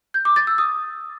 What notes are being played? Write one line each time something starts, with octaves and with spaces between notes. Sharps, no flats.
G6
D6
A6
E6
D#6